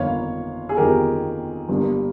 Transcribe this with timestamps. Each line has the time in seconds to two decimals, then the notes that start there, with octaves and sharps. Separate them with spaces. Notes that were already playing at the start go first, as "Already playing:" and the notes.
Already playing: G1 F2 D#3 A#3 C#5 F5
0.69 G#4
0.77 G1 F2 D#3 A#3 G4 A#4
1.69 G1 G2 G3 A#3